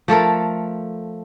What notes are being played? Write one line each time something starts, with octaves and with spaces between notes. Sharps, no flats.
F3 A3 A4 A#4